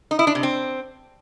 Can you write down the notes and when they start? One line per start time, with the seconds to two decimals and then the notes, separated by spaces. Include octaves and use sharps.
0.11 D#4
0.19 E4
0.27 D4
0.35 C3
0.43 C4